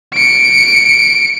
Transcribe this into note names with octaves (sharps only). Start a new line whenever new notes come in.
C#7 D7